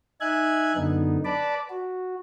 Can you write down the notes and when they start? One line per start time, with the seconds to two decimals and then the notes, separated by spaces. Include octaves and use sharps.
0.21 D#4 E5 G#5 F#6 G#6
0.76 F#2 D3 B3 D#4
1.25 B4 D5 A5 B5 D6
1.70 F#4